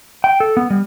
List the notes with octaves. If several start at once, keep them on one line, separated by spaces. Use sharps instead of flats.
G5
A4
B3
G3